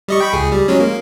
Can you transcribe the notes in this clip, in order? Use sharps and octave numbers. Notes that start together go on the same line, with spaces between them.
G3 D#5 C#6
G5 B5 C#6
C#2 G#4
G3
F#3 G#3 C#4
A#3